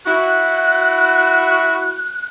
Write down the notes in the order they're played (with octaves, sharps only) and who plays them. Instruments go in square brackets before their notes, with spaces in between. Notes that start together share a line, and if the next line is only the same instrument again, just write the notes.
[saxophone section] E4 F#4 [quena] F#6